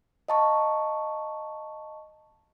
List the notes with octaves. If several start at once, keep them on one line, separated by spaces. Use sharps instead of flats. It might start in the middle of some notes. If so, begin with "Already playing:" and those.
D#5 F5 A5 A#5 C#6